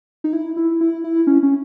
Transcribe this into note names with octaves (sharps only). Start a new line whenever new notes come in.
D#4
E4
E4
E4
E4
C#4
C#4